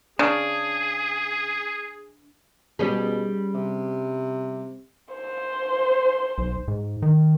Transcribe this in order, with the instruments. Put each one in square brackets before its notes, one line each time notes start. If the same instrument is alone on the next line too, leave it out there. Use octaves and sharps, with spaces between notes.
[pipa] C#3 [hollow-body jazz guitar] D4 [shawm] G#4
[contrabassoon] B2 [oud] G3 C#4 G#4
[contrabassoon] C3
[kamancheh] C5
[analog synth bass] B1
G#2
D#3